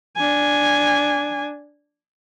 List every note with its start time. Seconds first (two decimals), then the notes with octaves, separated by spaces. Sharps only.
0.16 D4 G#5